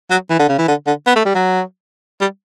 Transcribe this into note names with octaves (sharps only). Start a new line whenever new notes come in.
F#3
E3
D3
C#3
E3
D3
D3
B3
A3
G3
F#3
G3